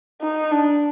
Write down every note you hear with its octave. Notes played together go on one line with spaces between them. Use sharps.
D#4
D4